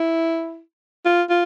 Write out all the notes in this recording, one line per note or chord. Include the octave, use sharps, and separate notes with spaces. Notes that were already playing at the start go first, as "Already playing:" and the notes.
Already playing: E4
F4
F4